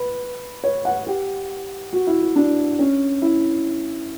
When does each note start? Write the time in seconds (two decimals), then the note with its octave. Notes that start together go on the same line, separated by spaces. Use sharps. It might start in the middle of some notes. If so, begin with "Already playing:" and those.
Already playing: B4
0.64 C#5
0.85 F#5
1.07 G4
1.93 F#4
2.07 E4
2.21 F#4
2.36 D4
2.79 C#4
3.22 E4